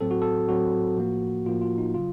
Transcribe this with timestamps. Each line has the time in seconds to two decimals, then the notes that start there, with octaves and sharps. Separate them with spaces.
0.01 A2 F#3 C4 A4
0.11 F#4
0.22 A4
0.49 A2 F#3 C4 F#4
0.97 A2 F3 A#3
1.46 A2 F3 A#3 F4
1.62 F4
1.78 D#4
1.94 C#3 F#3 F4